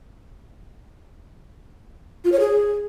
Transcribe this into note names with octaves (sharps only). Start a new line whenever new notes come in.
F4
C#5
G#4